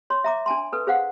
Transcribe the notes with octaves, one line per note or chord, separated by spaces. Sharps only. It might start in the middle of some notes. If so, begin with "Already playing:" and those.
C#5 C6
E5 A#5 D6
D4 G#5 A5 C6
A4 B4
G#4 C5 F5 F#5